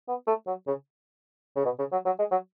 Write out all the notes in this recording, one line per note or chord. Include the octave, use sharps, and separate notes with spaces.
B3
A3
F#3
C#3
C#3
B2
C#3
F#3
F#3
G#3
F#3